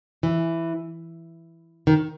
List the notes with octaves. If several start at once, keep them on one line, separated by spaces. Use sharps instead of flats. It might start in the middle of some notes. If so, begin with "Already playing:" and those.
E3
D#3